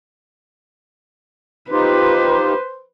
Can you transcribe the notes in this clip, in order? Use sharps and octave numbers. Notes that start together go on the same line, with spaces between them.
D#4 F4 G4 B4 C5